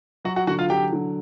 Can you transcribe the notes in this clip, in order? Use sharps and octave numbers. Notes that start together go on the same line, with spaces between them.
F#3 F#4 F#5
F#4 F#5
D3 F#4 F#5
F4 F5
F#3 G4 G5
D3